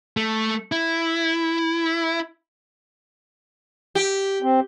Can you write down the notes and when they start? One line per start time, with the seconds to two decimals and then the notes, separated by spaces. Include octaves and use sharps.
0.17 A3
0.72 E4
3.95 G4
4.42 C4